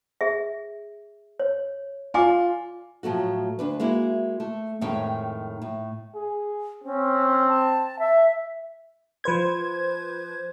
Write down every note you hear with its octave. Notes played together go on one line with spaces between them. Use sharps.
G#4 E5
C#5
F4 D5 G#5 D6
A2 F3 F#3 A3 F#4
D2 D4 B4
G#3 A#3 E4 F#4
A3
F2 A2 D#3 G#3 C#4 G5
A2
G#4
C4 C#4
A5
E5
F3 B4 C5 G#6